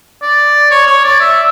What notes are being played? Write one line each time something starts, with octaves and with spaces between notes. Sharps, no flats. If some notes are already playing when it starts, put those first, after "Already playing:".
D5
C#5
C#5
D5
E5